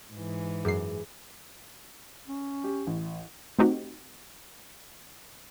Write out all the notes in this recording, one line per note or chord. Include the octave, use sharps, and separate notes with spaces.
G#2 E3
F#2 G#4 C7
C#4
G4
A1
A3 C4 D#4 F#4 G4